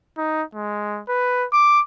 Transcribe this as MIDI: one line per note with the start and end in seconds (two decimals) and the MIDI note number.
0.18 0.43 63
0.54 1.01 56
1.09 1.46 71
1.53 1.81 86